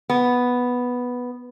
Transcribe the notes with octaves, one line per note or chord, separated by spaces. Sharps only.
B3